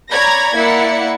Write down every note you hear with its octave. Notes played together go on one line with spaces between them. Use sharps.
C#5 D5 A#5 B5 G#6 A#6
A#3 E4 D5 F#5 C#7